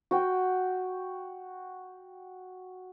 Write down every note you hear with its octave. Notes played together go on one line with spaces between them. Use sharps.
F#4 G5